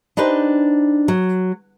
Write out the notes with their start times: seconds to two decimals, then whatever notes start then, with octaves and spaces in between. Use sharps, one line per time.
0.17 D4 D#4 G4 B4 C5
1.08 F#3